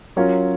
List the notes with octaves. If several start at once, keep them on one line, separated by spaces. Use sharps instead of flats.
F#3 C#4 F4 A#4 C#5